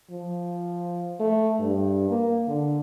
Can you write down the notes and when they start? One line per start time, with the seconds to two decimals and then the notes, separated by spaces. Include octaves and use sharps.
0.11 F3
1.20 A3
1.60 G2
2.10 A#3
2.48 D3